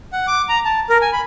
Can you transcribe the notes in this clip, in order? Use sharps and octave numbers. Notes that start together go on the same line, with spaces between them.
F#5
D6
A#5
A5
A#4
G#5
B5